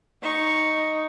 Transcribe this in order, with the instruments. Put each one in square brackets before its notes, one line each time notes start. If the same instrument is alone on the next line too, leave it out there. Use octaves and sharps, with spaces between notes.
[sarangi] D#4 [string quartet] C#6